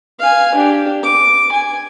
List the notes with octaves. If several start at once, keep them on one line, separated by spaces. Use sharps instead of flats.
F5 G#5
D4 G4
D6
G#5